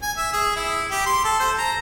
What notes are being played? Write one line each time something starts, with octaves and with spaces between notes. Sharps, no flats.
G#5
E5
G#4
E4
G4
C6
A4
C5
A#5